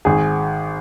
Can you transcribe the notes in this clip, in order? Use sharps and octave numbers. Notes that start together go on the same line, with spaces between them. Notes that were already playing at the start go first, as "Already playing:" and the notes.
G#1 G#4